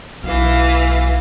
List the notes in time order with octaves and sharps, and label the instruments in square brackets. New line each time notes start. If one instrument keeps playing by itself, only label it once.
[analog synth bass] B1 [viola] E3 F5